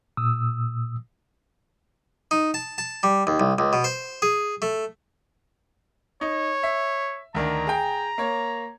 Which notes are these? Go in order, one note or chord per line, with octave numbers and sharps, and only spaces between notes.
A#2 D#6 E6
D#4
A5
A5
G3
D#2
C2
C#2
B2
C5
G#4
A3
D#4 C#5
E5
D2 D#3 D4 A#5
G#4 G5
A#3 C#5